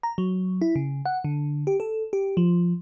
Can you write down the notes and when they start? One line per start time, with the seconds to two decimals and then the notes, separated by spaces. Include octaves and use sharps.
0.03 A#5
0.18 F#3
0.61 E4
0.76 C#3
1.06 F#5
1.24 D3
1.67 G4
1.80 A4
2.13 G4
2.37 F3